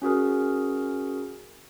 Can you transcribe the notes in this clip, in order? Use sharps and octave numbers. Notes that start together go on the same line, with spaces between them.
C#4 F#4 G#4 A#4